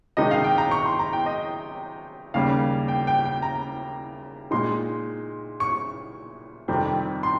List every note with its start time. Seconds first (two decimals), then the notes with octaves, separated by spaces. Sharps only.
0.17 C3 D#3 G#3 D#4 D#5
0.31 F5
0.44 G5
0.58 A#5
0.71 C#6
0.86 C6
0.99 A#5
1.13 G5
1.26 D#5
2.34 D#2 C#3 G3 A#3 F5
2.88 G5
3.07 G5
3.25 G5
3.42 A#5
4.51 A#2 G#3 D#4 C6
5.60 C#6
6.68 F2 C3 D#3 G3 C4
7.23 C6